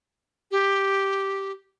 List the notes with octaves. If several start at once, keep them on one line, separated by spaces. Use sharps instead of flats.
G4